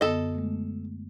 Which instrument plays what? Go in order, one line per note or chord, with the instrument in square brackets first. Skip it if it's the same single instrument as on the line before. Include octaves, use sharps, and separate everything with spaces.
[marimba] F#2 D3 B3 [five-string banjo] A4 D#5
[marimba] G#3 A3